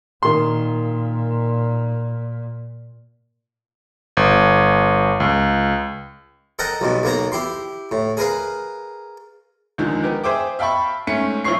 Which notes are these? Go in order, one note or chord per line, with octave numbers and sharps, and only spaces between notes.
A#2 D#3 C6
G1
C#2
A4 A#4 D#5 F#5 G5
B1 G2 B2
B1 A#3 B3 A#5
E4 G4 C6
A2
G#4 A#4 B4 F5
C#2 D3 D#3 F3 G#3
B3 G4 A#4
G#4 C5 E5 G5 D6
E5 F5 G5 A5 B5 C#6
G#2 A3 C#4 C#7
B1 F3 E4 C#5 C#6 C7